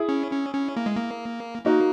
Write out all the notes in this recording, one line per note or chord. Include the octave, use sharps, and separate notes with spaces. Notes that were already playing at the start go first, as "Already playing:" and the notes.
Already playing: E4 G#4
C#4
C#4
C#4
A#3
G#3
A#3
A#3 D#4 F#4